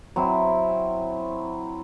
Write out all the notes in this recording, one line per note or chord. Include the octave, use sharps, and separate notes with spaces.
F#3 C4 E4